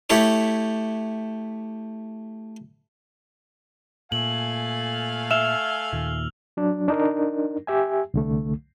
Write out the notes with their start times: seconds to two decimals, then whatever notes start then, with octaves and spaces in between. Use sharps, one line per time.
0.10 A3 E4 G4 A4 C#5
4.12 A#2 A3 F5 G#5 F#7
5.31 E5 E6 F6 E7 F7
5.93 D#2 A#2
6.57 F#3 D4
6.88 D4 D#4 A#4
7.67 G4 E5 G#5
8.14 C2 D3 A3